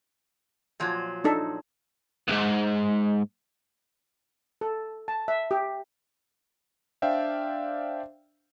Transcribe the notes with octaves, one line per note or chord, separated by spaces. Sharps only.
A#2 F3 F#3
D4 D#4 A4
B1 G#2
A4
A5
E5
G4
D4 C5 D5 E5 F5 G5